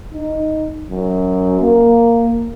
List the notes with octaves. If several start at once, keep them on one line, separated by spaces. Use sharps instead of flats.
D#4
F#2
A#3